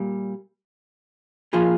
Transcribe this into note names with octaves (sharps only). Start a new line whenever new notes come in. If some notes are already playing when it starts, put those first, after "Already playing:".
Already playing: A#2 G3
A#2 F3 F4 G#4